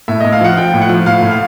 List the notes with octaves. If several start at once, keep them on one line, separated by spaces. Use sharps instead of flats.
A2 E5
A2 D#5
F5
F3 F#5
F3 G5
A2
F#5
F3
A2 F5
A2
F5